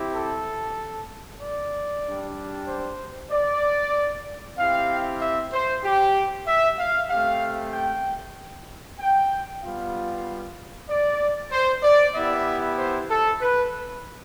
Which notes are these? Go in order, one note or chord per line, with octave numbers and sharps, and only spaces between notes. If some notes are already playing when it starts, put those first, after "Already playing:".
Already playing: C4 E4 G4
A4
D5
G3 D4 G4
C5
D5
C4 E4 G4 F5
E5
C5
G4
E5
F5
A3 C4 G4 F5
G5
G5
G3 B3 F4 F5
D5
C5
D5
B3 E4 G4 E5
C5
A4
B4